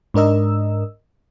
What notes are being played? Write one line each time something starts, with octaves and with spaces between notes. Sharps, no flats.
G#2 D4 A#4 D#5 E6